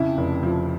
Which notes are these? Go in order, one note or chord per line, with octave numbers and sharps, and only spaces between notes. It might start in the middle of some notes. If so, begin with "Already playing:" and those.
Already playing: F2 C#3 E4
F1
F3